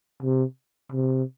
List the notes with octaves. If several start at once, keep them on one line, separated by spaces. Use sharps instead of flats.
C3
C3